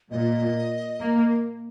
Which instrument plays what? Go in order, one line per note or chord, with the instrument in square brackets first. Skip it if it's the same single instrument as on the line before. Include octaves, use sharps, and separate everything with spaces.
[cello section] A#2 [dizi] D#5
[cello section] A#3